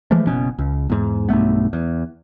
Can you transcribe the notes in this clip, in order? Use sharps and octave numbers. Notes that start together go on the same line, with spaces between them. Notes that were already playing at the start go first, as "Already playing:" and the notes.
E3 F3 G#3 A3
F#1 B2 C#4
C#2
E2 G#2
B1 G2 A3 B3
E2